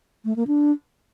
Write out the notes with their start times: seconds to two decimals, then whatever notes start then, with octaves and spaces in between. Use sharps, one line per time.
0.25 A3
0.36 A#3
0.47 D4